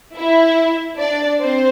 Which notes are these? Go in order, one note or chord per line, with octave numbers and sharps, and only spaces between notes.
E4 E5
D4 D5
C4 C5